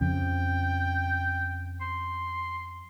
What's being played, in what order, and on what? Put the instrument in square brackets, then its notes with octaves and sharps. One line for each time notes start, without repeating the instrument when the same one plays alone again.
[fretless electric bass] F2 C#3 [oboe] G5
[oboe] C6